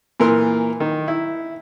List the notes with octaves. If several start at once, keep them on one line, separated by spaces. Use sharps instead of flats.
A#2 E3 A#4 C6
D#3
E4